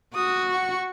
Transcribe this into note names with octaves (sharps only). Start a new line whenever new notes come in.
F#4 D#6
F#5 C#6